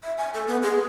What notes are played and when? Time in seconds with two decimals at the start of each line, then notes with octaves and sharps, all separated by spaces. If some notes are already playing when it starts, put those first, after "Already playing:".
0.03 E5
0.18 G#5
0.34 A4
0.47 B3
0.63 G#4